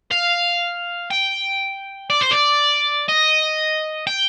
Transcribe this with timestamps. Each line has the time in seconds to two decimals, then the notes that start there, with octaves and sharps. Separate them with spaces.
0.11 F5
1.10 G5
2.10 D5
2.21 C5
2.31 D5
3.09 D#5
4.07 G5